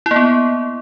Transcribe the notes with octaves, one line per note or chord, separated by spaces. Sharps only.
E4
A#3
B3